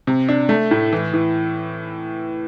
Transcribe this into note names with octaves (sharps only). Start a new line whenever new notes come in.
C3
D4
A3
A2
E3
E3